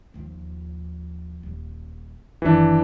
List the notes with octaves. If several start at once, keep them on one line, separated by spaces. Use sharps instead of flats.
D#2 F3
D#1
F#1 D#3 E3 D4